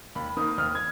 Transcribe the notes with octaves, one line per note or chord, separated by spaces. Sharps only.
D#2 B5
D#3 A#3 D#6
D#2 F6
G#6